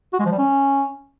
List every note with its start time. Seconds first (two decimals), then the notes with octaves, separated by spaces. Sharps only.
0.13 F#4
0.19 G#3
0.26 F3
0.32 G3
0.38 C#4